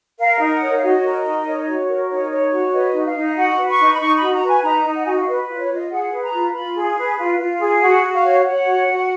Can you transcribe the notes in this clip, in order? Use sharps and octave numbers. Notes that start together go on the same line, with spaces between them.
A#4 F5
D#4
F#5
C#5
F5
F#4 D#5
A#4
D#4
C#5
F#4
A#4
D#4 C#5
C#5
F#4
B4 D#5
D#4
F5
D#4
F#4 F#5
B4
C#6
D#4
B5
D#4 C#6
F#4 B5
A#5
B4
G#5
D#4 A#5
D#4
F#5
F#4 G#5
F#5
F5
B4 D#5
F4
D#5
C#5
F4 D#5
G#4 F#5
B4
A#5
F4
F4 B5
G#4
B4
F4
F4
G#4
F#4 F#5
F#4
F5
C#5
C#5 F#5
F#4
F#4